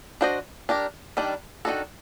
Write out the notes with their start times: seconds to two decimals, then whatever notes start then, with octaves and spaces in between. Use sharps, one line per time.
0.21 D4 F#4 C5 D#5
0.69 D4 G4 A#4
1.17 D#3 G3 D4
1.65 D#3 A3 D4 F#4 A4